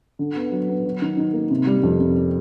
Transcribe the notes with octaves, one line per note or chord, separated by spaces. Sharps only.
D3
B3
F#3
B3
F#3
D#3
D#4
A#3
C3
G3
F2
C3